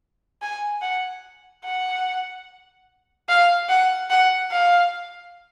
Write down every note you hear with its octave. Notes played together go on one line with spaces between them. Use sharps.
G#5
F#5
F#5
F5
F#5
F#5
F5